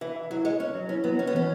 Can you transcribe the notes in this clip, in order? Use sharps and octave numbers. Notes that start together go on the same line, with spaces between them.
E3 E5
E5
F#3 E4
G#3 C#5
C#4 C#5
F#3
C#4 E4
F#3 B3
C#4 C#5
B3
E3 C#4